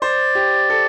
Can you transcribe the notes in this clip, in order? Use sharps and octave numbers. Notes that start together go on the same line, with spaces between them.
C5 D5
G4
A4